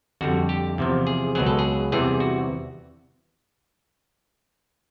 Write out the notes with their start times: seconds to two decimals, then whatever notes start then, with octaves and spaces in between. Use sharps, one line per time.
0.21 F2 D3 G3 F#4
0.49 G4
0.78 E2 C3 F3
1.07 G#4
1.35 C#2 B2 F#3 G#4
1.46 A4
1.59 G#4
1.92 E2 C3 E3 G3 G#4
2.20 F#4